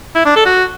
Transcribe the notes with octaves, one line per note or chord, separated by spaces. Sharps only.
E4
D4
A4
F#4